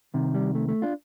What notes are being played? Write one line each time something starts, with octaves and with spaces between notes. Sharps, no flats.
C2 C3 D#3
G3
A3
A3
D4 F4